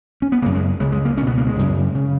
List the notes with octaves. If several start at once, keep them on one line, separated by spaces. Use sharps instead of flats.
C#4
B3
F#2 C#3 A#3
G#3
C#2 C#3 G#3
G#3
A#3
C#2 C#4
B2 B3
A#3
G#3
F#2 C#3
C#3